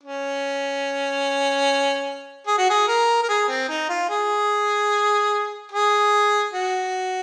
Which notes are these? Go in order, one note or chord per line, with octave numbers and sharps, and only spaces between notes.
C#4
G#4
F#4
G#4
A#4
A#4
G#4
C4
D#4
F4
G#4
G#4
F#4